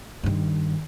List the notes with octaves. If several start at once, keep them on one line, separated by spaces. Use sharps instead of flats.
G2 D#3